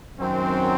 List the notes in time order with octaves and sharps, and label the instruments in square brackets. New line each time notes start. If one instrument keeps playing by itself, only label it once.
[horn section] F#2 D#3 F#3 C4